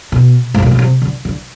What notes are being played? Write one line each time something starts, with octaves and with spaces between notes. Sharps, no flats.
B2
A2
A#2
B2
C3
D3
D3